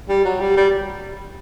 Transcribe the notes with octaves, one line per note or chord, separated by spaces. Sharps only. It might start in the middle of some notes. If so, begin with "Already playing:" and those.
G3
F#3
G3
G3